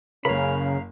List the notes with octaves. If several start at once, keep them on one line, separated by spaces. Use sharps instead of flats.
F#1 C#3 C#4 A#4 F5 B5